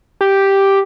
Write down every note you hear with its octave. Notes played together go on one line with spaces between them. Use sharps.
G4